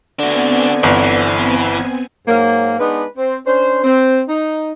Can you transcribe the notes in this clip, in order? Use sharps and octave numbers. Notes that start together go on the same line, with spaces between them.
D3 B3 C4 D4 F#4 G#5
G1 E3
G#2 F#3 A#3
G#3 B3 D4 D#4 B4
C4
C#4 D4 C5
C4
D#4